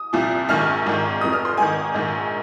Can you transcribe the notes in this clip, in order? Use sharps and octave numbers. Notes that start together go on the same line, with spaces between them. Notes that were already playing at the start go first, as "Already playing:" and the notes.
Already playing: D#6
C2 A#2 F3
A#1 G#2 D#3 F6
G#1 G#2 D#3
F1 F2 F3 D#6
F6
C6
G#1 G#2 D#3 G#5
A#1 G#2 D#3